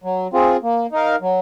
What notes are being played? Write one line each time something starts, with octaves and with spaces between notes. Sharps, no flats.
F#3
C4 F4 G#4
A#3
D#4 A#4 F5
F#3